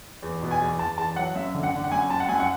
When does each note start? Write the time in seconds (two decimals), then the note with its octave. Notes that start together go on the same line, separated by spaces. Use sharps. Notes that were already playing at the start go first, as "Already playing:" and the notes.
0.22 E2
0.42 B2
0.51 G#5
0.61 E2
0.79 E2 A5
0.98 E2 A5
1.16 F#3 F#5
1.35 F#2 E5
1.54 D3
1.63 F#5
1.73 D3
1.84 F#5
1.92 F#2 G#5
2.10 F#2 A5
2.20 F#5
2.29 F#2 G#5
2.40 F#5